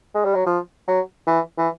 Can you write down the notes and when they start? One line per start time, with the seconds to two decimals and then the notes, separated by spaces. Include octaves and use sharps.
0.15 G#3
0.25 G3
0.35 F#3
0.46 F3
0.87 F#3
1.27 E3
1.58 E3